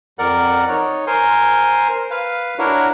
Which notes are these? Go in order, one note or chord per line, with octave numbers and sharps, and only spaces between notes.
F2 A#4 D5 F#5 F#6
D#4 C#5
A#4 C5 G#5 C6
B4 F5
D4 E4 F#4 A#4 C#5